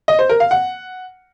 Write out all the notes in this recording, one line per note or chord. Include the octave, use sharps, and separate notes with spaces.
D#5
C5
A#4
F5
F#5